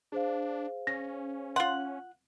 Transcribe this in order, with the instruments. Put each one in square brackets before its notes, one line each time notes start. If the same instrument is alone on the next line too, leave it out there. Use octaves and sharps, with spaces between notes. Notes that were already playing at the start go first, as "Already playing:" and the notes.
[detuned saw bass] D4 [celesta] G#4 C5 F5
[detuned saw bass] C#4 [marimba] A#6
[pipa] F4 F#5 [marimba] C6